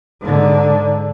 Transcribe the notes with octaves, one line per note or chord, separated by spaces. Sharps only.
G#2 D3